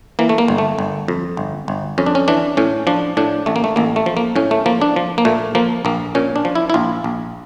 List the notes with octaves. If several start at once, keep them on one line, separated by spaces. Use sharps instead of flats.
E3 A#3
A3
A#3
G1
A3
G1
F2
G1
G1
F2 C#4
D4
C#4
E3 D4
A2 C#4
F3 D4
A2 D4
A1 A3
A#3
A3
A1 A#3
A3
F3
A#3
A2 C#4
A3
F3 A#3
D4
F3
A#3
A#2 A3
F3 A#3
A#1 A#3
A#2 C#4
D4
F3
E4
E4
A#1 F4
A#1